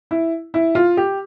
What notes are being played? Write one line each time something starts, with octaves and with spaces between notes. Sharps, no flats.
E4
E4
F4
G4